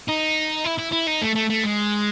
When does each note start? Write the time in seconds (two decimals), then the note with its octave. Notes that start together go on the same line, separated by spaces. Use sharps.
0.08 D#4
0.65 E4
0.79 E4
0.92 E4
1.08 D#4
1.22 A3
1.36 A3
1.50 A3
1.64 G#3